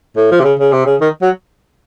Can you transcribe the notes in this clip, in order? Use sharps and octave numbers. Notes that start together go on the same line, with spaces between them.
A2
F3
C3
C#3
C#3
C3
C#3
D#3
F#3